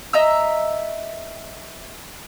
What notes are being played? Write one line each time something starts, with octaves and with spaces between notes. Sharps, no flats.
D#5 E5 A#5 E6